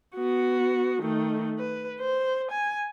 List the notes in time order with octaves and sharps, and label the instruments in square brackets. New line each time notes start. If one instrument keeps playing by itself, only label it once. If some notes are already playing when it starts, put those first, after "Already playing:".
[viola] B3 F#4
D#3 A3
B4
C5
G#5